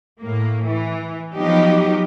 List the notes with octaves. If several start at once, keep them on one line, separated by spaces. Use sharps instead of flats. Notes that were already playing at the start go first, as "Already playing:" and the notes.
A2 A#3
E3
F3 F#3 B3 D#4 G4